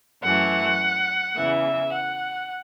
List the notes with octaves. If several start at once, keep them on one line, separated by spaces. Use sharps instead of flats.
F#2 E3 A3 F#5
E2 C#3 E3 E5
F#5